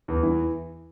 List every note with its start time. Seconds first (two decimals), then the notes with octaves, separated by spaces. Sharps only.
0.08 E2
0.23 E3